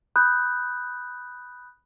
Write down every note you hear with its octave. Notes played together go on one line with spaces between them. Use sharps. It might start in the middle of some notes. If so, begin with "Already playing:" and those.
B5 D#6 F#6 G6